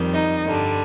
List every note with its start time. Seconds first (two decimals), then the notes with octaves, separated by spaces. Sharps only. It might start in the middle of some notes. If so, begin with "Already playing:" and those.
Already playing: F2 D#3 G3
0.14 D#4
0.46 G2 D3 G3